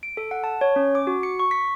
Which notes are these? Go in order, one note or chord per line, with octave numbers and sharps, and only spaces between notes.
D7
A4
F#5
A5
C#5
C#4
D6
F#4
C#7
C#6
B6